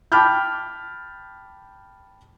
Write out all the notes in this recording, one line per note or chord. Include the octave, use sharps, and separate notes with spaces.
G5 A5 B5 D6 F6 G6